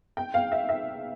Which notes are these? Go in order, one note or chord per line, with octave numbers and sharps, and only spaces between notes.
G5
F5
E5
E5